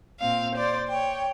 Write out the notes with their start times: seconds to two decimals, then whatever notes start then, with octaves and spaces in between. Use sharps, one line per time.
0.20 A#2 C4 F5
0.54 C5 D5 A6
0.89 C#5 G5